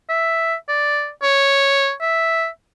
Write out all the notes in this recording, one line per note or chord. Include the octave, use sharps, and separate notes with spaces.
E5
D5
C#5
E5